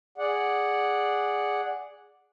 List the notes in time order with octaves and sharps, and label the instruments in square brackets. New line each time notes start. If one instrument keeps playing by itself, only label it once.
[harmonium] G#4 D5 F#5